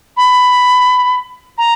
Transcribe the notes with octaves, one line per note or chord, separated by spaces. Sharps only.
B5
A#5